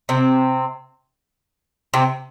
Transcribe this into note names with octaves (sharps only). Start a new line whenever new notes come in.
C3 C4
C3 C4